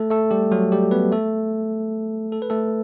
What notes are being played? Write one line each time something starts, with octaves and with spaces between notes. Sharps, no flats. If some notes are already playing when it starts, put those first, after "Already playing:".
Already playing: A3 A4
A3 A4
G3 G4
F#3 F#4
G3 G4
B3 B4
A3 A4
A4
B4
A3 A4